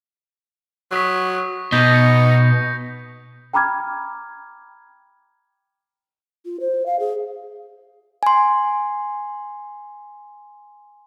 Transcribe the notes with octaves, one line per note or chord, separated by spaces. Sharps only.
F#3 C#6 D#6 B6
B2 D#4 G6 A#6 B6
A#6 C#7
G5 A#5 B5 D6 F6 G#6
F4
C5
F5
G#4
G#5 C6